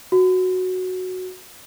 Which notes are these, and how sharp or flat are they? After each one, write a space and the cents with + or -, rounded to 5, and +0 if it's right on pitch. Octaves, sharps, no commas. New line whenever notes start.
F#4 -5